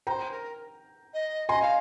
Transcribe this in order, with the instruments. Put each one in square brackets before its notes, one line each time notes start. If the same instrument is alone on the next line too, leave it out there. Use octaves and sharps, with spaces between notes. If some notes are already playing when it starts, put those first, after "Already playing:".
[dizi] C5 [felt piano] G5 A#5
[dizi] A#4
D#5
[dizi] D#5 [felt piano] G#5 C6
[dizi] F5